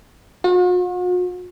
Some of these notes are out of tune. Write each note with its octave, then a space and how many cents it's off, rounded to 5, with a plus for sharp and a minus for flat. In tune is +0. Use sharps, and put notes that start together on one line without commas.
F#4 -45